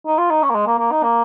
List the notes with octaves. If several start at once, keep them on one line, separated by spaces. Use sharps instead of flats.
D#4
F4
D#4
C#4
A#3
G#3
A#3
A#3
D#4
A#3